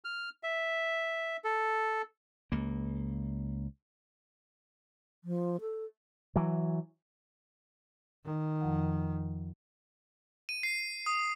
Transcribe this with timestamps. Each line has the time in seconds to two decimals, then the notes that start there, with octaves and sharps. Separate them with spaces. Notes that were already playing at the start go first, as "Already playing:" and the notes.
0.05 F6
0.43 E5
1.44 A4
2.52 C#2 A#3
5.24 F3
5.61 A4
6.36 E3 F#3
8.25 D#3
8.61 F2 F3 F#5
10.49 D#7
10.63 C7
11.06 D#6